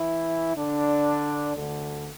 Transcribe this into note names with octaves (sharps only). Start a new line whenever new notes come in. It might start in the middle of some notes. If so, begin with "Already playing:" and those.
Already playing: E3 E4
D3 D4
D2 D3